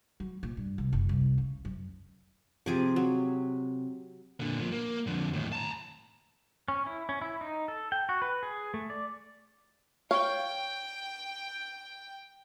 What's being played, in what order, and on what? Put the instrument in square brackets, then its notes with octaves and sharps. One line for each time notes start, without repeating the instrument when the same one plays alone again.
[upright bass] F#3
A#2
G2
C2
F#1
C2
C#3
F#2
[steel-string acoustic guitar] C3 [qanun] F3 G#4 D6
[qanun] F#3
[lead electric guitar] A#2 D3
A#2 F3
A#3
F2 D3
D#2 A2
A5 A#5
[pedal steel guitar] C#4
E4
C#4
E4
D#4
A4
G5
F#4
B4
G#4
A3
D5
[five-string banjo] C#5 F5 [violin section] G5